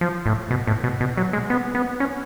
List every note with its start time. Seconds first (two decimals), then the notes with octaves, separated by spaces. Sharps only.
0.01 F3
0.26 A2
0.51 B2
0.67 A2
0.84 B2
1.01 B2
1.17 F#3
1.33 G#3
1.50 B3
1.75 B3
2.00 C#4